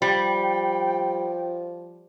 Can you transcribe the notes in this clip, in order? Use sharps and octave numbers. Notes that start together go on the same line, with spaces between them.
F3 G3 G5